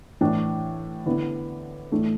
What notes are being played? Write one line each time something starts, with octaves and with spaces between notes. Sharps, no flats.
A2 E3 D4
D3 B3 E4
A2 E3 A3 D4